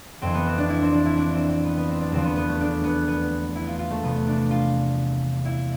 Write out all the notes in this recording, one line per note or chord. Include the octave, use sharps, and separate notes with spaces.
F2 E3 C4
B3
C4
D4
E4
C4
D4
E4
D4
C4
C4
B3
B3
C4
D4
E2 D3 F3 C4
B3
B3
A3
D4
B3
B3
E4
F4
F4
A3
E2 C3 F3 B3
D4
F4
E4